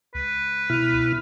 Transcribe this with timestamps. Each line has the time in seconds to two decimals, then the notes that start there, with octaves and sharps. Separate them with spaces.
0.15 C#2 B4
0.70 B2 E4 F6